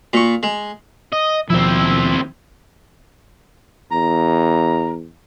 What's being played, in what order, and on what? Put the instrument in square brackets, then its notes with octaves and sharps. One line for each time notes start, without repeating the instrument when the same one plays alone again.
[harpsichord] A#2 C#6
G#3
[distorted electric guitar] D#5
[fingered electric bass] D#2 B2 F3 [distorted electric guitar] C4 E4
[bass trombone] E2 [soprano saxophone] A#5